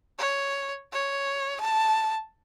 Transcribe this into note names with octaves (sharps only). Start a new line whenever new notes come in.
C#5
C#5
A5